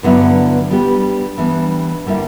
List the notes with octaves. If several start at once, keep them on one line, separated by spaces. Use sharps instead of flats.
G2 D3 F#3 B3 E4
G3 B3 D4 G4
E3 G3 B3 D4
D3 G3 A#3 E4